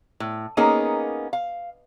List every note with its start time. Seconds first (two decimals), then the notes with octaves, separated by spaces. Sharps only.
0.20 A2
0.57 A#3 B3 C#4 D#4 G#4 A#4
1.33 F5